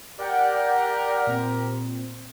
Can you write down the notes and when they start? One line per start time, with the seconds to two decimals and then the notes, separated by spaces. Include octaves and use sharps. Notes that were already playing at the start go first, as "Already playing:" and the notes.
0.19 G4 A#4 D5 F#5 G5
1.27 A#2 C4